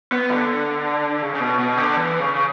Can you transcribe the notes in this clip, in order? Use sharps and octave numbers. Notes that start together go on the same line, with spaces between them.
B3
D3
C#3
C#3
B2
B2
D3
E3
C#3